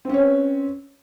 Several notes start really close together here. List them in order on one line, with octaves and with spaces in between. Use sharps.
C4 C#4 C#5 B4